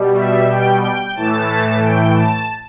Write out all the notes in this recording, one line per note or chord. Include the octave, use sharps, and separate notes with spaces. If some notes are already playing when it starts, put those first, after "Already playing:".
Already playing: B2 G3
E5
G5
G5
A2 E3 A3 A5
G5
A5